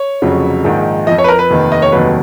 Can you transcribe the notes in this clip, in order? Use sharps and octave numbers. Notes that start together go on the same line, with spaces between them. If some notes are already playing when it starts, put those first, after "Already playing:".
Already playing: C#5
F1 F2 C#3 F#3
A#1 G#2 D#3
F2 F3 D#5
C#5
B4
A#4
B4
F1 D#2 D#3
D#5
C#5
F1 D#2 D#3 F#3 B4